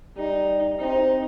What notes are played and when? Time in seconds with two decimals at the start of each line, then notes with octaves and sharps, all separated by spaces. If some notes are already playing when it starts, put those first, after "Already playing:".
0.17 G3 D#4
0.79 C4 D#4